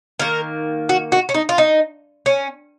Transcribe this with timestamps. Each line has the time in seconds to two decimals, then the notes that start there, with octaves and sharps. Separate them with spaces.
0.19 D#3 A#3 A#4
0.89 F#4
1.12 F#4
1.29 C#4
1.34 D#4
1.49 F4
1.58 D#4
2.26 C#4